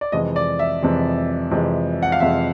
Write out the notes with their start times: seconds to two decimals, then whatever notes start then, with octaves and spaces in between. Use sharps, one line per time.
0.01 D5
0.12 F2 C3 E3 G#3 D#5
0.36 D5
0.59 E5
0.83 F2 C3 E3 G#3
1.51 F2 C3 E3 G#3
2.03 F#5
2.12 F5
2.20 F2 C3 E3 G#3 E5